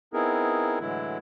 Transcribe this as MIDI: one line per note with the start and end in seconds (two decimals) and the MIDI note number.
0.14 0.79 59
0.14 0.79 60
0.14 0.79 63
0.14 0.79 64
0.14 0.79 68
0.14 0.79 70
0.80 1.18 45
0.80 1.18 50
0.80 1.18 52
0.80 1.18 54
0.80 1.18 56
0.80 1.18 64